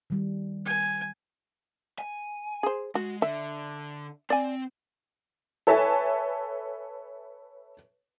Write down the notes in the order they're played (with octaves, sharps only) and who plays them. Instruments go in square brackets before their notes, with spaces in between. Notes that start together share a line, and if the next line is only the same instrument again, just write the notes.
[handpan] D#3 G3
[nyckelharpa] G#5
[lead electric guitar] G#5
[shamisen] G#4 C5
[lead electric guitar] G#3 [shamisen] F#4
[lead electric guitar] D3 [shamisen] E5
[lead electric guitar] C4 [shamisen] D5 G#5
[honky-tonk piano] A4 B4 C#5 E5 G#5 A5